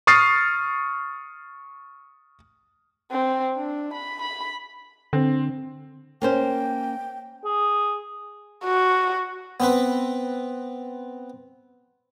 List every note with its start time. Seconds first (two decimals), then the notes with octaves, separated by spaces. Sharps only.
0.07 C#6 D#6 F6 A6 C7
3.12 C4
3.56 D4
3.94 B5
4.22 B5
5.13 D3 C4
6.22 A#3 C#4 C5 G5
7.45 G#4
8.65 F#4
9.60 B3 C4 B4